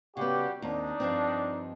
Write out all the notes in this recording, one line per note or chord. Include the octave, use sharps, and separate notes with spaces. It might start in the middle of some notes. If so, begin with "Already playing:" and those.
C#3 G3 B3 F#4 G4
D#2 C4 D4 D#4
G2 F3 C4